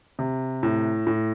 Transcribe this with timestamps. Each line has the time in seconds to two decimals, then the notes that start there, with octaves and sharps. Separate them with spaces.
0.19 C3
0.63 A2
1.07 A2